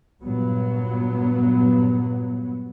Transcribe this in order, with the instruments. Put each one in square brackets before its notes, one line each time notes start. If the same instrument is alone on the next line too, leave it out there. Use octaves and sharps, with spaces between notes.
[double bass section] G2 A#2 F#3 B3